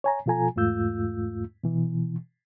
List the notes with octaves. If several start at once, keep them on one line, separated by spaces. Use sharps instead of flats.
C#5 G#5 A#5
B2 F3 F4 A4 G#5 A#5
E2 G#2 A3 F4 E6 G6
B2 E3